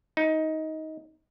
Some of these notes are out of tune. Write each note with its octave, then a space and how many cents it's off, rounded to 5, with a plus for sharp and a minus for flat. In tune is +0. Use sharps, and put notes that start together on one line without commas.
D#4 +15